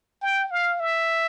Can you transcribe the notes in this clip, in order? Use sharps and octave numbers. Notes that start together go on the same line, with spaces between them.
G5
F5
E5